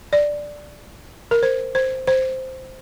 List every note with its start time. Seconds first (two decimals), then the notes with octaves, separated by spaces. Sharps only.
0.13 D5
1.31 A#4
1.43 C5
1.75 C5
2.07 C5